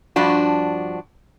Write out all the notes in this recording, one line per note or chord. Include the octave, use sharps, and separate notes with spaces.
G2 F3 D4 F#4